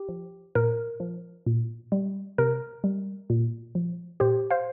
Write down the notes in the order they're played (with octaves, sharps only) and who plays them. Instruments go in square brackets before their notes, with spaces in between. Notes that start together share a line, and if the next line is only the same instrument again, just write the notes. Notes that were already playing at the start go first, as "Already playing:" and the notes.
Already playing: [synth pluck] G4
F3
A#2 A#4
F3
A#2
G3
C3 A#4
G3
A#2
F3
A#2 G4 C5
C5 F5